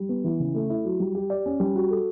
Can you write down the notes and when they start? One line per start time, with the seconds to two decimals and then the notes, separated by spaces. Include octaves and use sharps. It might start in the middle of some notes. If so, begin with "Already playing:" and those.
Already playing: G3
0.09 B3
0.24 E3
0.40 C#3
0.55 A3
0.70 E4
0.85 F#3
1.00 G3
1.15 G4
1.30 D5
1.46 C#4
1.60 G3
1.76 F#4
1.90 A4